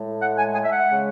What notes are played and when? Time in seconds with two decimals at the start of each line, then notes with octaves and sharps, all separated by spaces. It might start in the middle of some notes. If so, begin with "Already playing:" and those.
Already playing: A2 G#3
0.21 F#5
0.38 G#5
0.54 G#5
0.65 E5
0.72 F#5
0.88 C#3 G#3